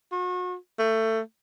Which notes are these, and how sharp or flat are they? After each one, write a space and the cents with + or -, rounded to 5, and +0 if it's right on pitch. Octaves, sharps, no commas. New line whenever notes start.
F#4 -35
A3 +20